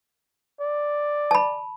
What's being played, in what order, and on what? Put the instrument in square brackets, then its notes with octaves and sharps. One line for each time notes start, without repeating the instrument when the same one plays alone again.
[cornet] D5
[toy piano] A5 B5